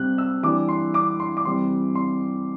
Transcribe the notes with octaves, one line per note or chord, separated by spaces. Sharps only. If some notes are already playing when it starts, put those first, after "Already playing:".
Already playing: C3 G3 C4 F#6
E6
E3 G3 D4 D6
C6
D6
C6
D6
C3 E3 G3 C6
C6